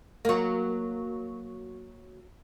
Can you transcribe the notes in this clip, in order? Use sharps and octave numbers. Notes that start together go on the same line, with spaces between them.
F#3 A#3